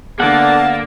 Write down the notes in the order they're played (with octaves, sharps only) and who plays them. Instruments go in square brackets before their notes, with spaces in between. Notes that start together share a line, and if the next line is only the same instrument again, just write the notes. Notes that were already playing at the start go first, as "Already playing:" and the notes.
[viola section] D3 [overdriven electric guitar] A#3 [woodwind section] B3 A5 [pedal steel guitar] F#5